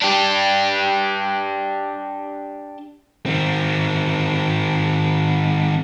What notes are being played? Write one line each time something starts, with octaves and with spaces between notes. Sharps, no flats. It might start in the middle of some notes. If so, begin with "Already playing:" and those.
D4 G4
D#3 C4